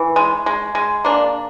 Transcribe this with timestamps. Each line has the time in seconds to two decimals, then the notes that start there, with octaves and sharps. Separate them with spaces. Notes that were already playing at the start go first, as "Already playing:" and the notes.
Already playing: E3
0.16 G#3
0.46 G#3
0.75 G#3
1.04 A#3 D4